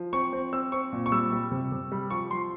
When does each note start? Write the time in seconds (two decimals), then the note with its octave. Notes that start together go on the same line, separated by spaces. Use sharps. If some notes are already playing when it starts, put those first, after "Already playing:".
Already playing: F3
0.13 C4 C#6
0.33 C4
0.53 C4 E6
0.72 C4 C#6
0.92 A#2
1.06 C#6
1.12 G3 E6
1.32 G3
1.52 C3
1.72 C3
1.92 G3
2.10 F3 C#6
2.31 F3 C6